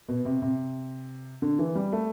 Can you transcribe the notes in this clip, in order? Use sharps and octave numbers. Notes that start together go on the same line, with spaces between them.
B2
C3
C3
D3
E3
G3
A3